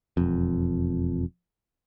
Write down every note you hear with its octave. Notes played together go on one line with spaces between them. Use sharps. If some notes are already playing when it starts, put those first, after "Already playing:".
E1 F2